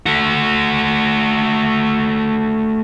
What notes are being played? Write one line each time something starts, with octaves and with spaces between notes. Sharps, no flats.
A3 F#4